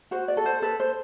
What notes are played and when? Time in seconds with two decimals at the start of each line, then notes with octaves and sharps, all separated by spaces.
0.11 F#4 C5
0.28 D5
0.37 A4
0.46 C5
0.62 A4 B4
0.80 C5